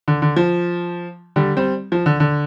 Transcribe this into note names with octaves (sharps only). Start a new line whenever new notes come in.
D3
D3
F3
D3 G3
G3 C4
F3
D3
D3